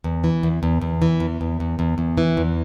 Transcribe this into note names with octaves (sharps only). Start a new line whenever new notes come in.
E2
E3
E2
E2
E2
E3
E2
E2
E2
E2
E2
E3
E2